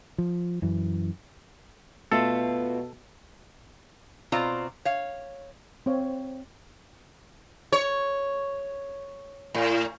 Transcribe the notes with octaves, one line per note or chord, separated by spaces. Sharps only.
F3
F#2 E3
B2 A3 F4 A4 A5
B2 C4 F4 D5 A#5
C#5 F5
C4 C#5 F5
C#5
A2